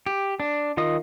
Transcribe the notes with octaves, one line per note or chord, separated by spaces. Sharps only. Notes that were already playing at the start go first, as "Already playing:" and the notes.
G4
D4
D#3 F4 D#5 D#6